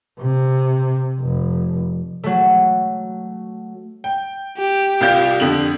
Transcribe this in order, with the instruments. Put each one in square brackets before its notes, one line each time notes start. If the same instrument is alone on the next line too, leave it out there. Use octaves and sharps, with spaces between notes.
[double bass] C3
F1
[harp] F#3 A3
[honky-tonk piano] G5
[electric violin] G4
[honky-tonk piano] C2 F4 G6
F2 D3 F#7